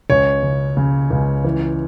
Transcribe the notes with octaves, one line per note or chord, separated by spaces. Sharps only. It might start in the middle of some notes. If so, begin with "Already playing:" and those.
C#2 C#5
C#3
C#3
C#2
E3